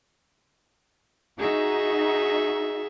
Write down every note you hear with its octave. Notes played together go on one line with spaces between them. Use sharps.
D#4 F#4 G#4 E5